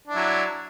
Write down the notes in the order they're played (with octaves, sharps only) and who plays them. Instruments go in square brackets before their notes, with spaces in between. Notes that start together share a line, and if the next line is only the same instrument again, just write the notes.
[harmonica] D4
E4
F#3